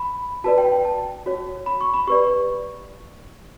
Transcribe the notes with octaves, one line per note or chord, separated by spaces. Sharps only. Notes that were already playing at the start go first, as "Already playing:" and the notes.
Already playing: B5
F#4 B4 D5 A5
G5
G5
A5
F#4 C#5
B5
C#6
B5
G4 B4 D5 C#6